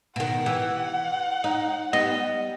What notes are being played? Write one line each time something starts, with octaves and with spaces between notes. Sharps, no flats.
B2 D#3 F#5
E3 G4
D#4
G3 B3 D#5